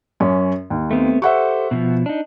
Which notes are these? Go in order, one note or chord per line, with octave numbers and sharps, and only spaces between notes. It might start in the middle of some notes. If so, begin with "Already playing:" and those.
F#2 C#4
D#2
A3 B3 C4
G4 A4 C5 E5 F#5 C#6
B2 D#3 F3
D4 D#4